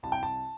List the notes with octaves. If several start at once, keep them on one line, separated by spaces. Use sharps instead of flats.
C2 A5
G5
A5